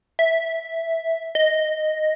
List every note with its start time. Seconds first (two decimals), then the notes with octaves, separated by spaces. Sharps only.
0.19 E5
1.35 D#5